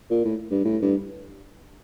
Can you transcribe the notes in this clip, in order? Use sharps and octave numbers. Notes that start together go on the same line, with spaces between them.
A#2
A2
G2
A2
G2